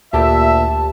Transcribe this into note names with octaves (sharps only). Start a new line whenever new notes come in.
D2 A#2 G4 E5 A5